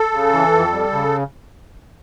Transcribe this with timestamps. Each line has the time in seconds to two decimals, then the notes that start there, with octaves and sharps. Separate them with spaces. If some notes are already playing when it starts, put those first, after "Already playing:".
Already playing: A4
0.13 C#3
0.33 E3
0.53 F2
0.73 G3
0.93 C#3